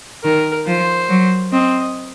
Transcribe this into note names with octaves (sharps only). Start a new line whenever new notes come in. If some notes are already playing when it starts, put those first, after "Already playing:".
D#3 A#4
F3 C5
F#3
C4 D#5